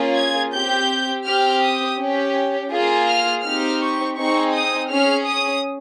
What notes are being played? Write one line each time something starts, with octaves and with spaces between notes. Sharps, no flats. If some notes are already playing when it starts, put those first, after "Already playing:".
Already playing: A#3 C#4 F4 G#4
G#6
C4 G4 G6
C4 G4 F6
D#6
C#4 G4
A#3 F4 G#4
F6
C4 D#4 G4 F6
C#6
C4 D#4 G#4 C#6
D#6
C#4 G#4 F6
D#6